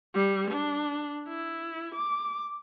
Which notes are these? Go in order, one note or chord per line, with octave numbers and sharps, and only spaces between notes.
G3
D4
E4
D6